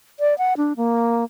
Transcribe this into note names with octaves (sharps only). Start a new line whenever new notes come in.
D5
F#5
D4
A#3